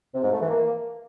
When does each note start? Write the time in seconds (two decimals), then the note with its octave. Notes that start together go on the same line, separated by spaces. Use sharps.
0.15 C3
0.23 G#2
0.32 A3
0.41 E3
0.49 A#3